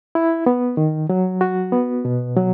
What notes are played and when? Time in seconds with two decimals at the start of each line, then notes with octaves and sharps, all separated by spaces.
0.15 E4
0.46 B3
0.77 D#3
1.09 F#3
1.41 F#4
1.72 B3
2.05 B2
2.36 F#3